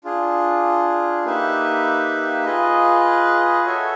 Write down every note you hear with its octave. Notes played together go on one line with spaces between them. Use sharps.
D4 F4 G#4
A#3 D#4 G4 B4 E5
F4 G#4 B4 D#5
F#4 A4 C#5 E5 G#5